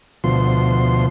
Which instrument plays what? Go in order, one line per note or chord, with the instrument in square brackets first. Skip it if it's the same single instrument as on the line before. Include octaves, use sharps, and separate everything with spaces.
[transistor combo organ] D2 B2 F3 C6